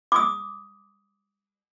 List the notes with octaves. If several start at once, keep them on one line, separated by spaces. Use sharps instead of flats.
D6 D#6